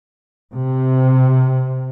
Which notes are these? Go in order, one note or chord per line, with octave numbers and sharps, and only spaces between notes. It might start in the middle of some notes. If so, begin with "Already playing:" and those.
C3